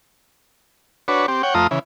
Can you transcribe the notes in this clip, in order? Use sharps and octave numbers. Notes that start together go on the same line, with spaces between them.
D4 F#4 B4 C#5
C4 G4
C#5 F#5 G5
F2 A3 F4 A#5 D#6
C#3 E3